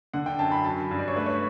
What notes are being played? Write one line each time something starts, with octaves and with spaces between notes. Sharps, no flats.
D3 F#5
G5
F#2 A5
B5
F#3 A5
G2
D5
C#5
A3 B4
C#5